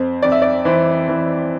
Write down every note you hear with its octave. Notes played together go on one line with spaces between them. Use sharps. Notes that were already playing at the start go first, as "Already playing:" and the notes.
Already playing: F2 C5
F2 D5
E5
D5
E3 C5
E3